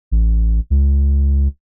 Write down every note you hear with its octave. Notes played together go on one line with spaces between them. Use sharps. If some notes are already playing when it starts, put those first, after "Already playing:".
A1
C#2